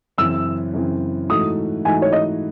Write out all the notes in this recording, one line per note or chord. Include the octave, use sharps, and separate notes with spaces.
F#2 C#3 E3 C4 E6
F#2 C#3 E3 C4
G#2 E3 A3 D#4 F#4 D#6
G#2 E3 A3 D#4 F#4 G#5
C#5
D#5